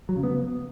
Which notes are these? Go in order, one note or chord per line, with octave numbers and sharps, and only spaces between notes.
F#3
C#3
B3